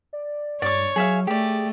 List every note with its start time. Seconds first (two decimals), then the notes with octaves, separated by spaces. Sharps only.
0.13 D5
0.62 G2 C#5 D5 D6
0.96 F#3 G#4 E5 F5
1.27 A3 G4 G#4 D5